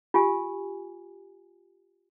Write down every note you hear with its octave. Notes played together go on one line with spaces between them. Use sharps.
F4 G4 G#5